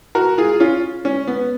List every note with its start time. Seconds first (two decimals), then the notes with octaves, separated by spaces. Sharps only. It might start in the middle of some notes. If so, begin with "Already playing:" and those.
0.15 F#4 A#4
0.38 F4 G#4
0.60 C#4 F4
1.05 C#4
1.27 B3